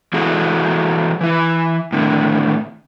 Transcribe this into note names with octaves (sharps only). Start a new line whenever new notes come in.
E3 E4 F#4 G#4 A4
E3 E4
A2 D3 D#3